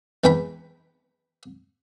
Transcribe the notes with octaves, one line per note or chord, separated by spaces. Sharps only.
E2 G#2 B4 G5 B5